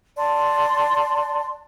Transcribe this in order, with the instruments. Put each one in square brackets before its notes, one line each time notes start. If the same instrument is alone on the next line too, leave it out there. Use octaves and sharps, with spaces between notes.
[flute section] D5 A5 C6